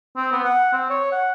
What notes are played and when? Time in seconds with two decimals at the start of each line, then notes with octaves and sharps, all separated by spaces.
0.17 C4
0.32 B3
0.44 F#5
0.73 C4
0.90 C#5
1.12 F#5